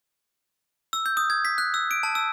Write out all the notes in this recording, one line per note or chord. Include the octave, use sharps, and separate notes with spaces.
E6
G6
D#6
G#6
B6
F#6
E6
D7
A5
E6